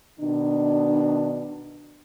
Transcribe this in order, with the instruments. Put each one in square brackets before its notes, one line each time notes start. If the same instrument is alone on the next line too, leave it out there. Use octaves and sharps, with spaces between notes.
[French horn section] B2 D#3 D4